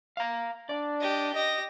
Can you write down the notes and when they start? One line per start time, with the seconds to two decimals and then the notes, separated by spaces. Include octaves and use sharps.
0.17 F5 A#5
0.69 D4 D5
1.01 G4 D#5
1.35 G4 D#5 A#6